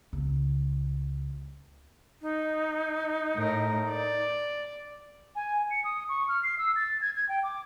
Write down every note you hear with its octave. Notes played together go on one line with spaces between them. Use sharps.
C#2
D#4
A2 A#4
D5
G#5
C#7
D#6
C#6
F6
C7
E6
A6
G#6
G#6
G5
D6